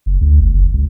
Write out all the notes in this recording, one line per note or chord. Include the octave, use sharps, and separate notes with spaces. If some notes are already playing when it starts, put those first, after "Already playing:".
F#1
D2
G1
F#1
C#2